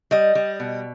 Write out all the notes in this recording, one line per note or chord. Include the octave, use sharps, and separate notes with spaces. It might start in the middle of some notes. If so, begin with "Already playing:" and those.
G3 D#5
G3
B2